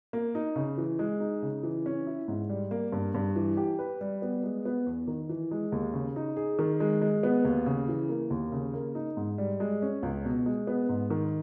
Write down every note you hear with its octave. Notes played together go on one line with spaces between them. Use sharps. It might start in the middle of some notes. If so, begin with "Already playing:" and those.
A#3
D#4
C#3
E3
G#3
D#4
C#3
E3
C#4
E4
G#2
G3
A#3
G2
G2
E3
G4
B4
G3
B3
G#3
B3
E2
D#3
E3
G#3
D#2
C#3
D#4
G#4
D#3
G#3
G#3
B3
D#2
C#3
E3
A#3
D#2
C#3
A#3
D#4
G#2
G3
G#3
C#4
C#2
B2
G#3
B3
G#2
D#3